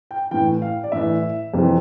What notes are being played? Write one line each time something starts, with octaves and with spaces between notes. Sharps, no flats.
G5
A2 E3 G5
F5
D5
A2 E3 E5
F2 C3 E3